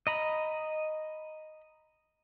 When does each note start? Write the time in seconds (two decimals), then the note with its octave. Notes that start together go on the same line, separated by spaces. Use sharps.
0.07 D#5 A#5 B5